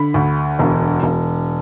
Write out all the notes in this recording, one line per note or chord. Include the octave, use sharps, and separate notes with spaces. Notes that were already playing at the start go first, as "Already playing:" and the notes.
Already playing: D3 B5
D2
E1
E1